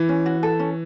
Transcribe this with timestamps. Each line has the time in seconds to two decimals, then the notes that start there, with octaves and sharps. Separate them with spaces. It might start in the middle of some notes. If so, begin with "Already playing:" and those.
Already playing: E3
0.09 C#4
0.26 F#4
0.43 A4
0.59 C#4